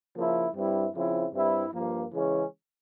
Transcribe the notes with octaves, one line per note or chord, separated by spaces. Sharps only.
C#3 F3 A#3 E4
G2 G3 C4 E4
C#3 F3 C4 E4
G2 G3 C4 E4
G2 F3 A#3
C#3 E3 G#3 C#4